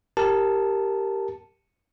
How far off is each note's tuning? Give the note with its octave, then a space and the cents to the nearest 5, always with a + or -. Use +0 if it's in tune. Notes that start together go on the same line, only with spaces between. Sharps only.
G4 +0 A#4 -10 A5 +0